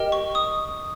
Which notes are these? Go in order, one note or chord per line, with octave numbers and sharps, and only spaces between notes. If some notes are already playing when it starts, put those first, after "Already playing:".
Already playing: G4 A#4 D#5 G5
C#6
D#6